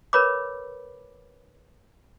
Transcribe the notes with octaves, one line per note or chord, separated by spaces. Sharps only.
A#4 B4 C#5 B5 D6